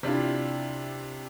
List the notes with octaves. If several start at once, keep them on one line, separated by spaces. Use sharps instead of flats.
C3 D4 E4 F4